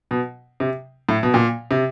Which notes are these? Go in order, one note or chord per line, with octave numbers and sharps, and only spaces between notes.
B2
C3
A2
B2
A#2
C3